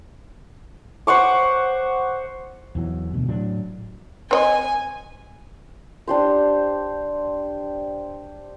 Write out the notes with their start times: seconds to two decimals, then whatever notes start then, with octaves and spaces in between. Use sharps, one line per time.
1.07 C5 F#5 C#6 D6
2.75 E2 E3 F#3
3.14 D2 B2
3.28 A2 F#3 D4
4.31 C4 C#5 D#5 G#5
6.07 D4 G4 C5